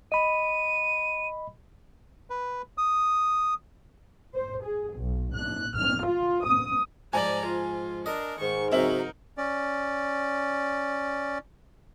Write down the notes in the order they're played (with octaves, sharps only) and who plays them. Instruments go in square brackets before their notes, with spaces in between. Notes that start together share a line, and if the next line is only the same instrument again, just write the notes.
[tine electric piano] D#5 B5 [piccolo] D#7
[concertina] B4
D#6
[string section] C5
G#4
B1
F#6
F6
F4
D#6
[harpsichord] G#2 F3 [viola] D5 A#5 [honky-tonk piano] G#5 F#7
[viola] F4
[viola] D4 A#4 [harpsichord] D#5
[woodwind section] G#2 [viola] D#3 C#6
[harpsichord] C#3 F#3 [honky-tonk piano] C4 E5 F#7 [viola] D#4 A#4
[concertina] C#4 D5